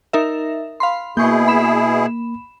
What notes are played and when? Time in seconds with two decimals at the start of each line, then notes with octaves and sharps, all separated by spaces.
0.13 D#4 A#4 E5
0.80 F5 B5 C6
1.17 B2 A#3 E4 G#4 C#6 G6
1.48 B5 E7